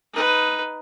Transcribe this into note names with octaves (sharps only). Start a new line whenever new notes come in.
D#4 B4